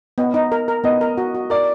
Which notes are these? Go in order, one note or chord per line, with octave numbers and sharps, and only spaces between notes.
B3 D#5
D#4
A#4
A#4
B3 D#5
A#4
F#4
F#4
A#4 D5